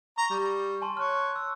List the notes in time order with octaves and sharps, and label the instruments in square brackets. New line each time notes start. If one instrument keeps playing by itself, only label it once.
[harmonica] A#5 [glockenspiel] C#6
[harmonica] G3
[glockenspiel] G#5 A5 C6
[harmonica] C#5 [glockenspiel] F6 F#6
[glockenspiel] E6